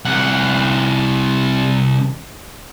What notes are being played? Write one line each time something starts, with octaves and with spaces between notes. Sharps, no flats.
C2 F#5